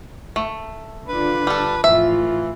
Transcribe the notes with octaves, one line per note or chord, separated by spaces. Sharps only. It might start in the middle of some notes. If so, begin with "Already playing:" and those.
A3
D3 D4 F4 B4
G3 A4
F2 A2 E3 F4 E5